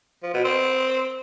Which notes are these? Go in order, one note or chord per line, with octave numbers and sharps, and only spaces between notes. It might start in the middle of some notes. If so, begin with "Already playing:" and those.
F3
B2
C4